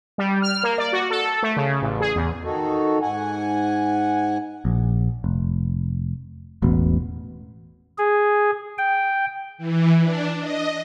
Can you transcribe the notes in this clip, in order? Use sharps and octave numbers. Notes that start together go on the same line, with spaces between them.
G3
F6
A#3
D5
F#4
A4
A3
C#3
A1
G#4
E2
D#3 D#4 F#4 A4
G#2 F#5 G#5
A#1
F1
E1 A1 B2
G#4
G5
E3
D4
D#5